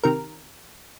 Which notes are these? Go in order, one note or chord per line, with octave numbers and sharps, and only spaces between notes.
C3 D#3 A#4